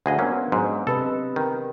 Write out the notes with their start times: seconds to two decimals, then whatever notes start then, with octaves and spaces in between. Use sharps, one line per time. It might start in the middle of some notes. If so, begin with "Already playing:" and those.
0.06 D2 G#4 D#5 F5 F#5
0.19 F#3 A#3 B3 C#4 D4 C5
0.52 G#2 F#3
0.87 C3 A4 B4 D#5
1.36 D#3